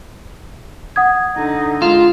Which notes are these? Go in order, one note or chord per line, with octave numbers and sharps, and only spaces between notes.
F#5 D#6 G#6
D3 D#4
G#3 F4 E7